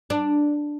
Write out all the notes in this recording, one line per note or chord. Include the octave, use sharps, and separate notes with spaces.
D4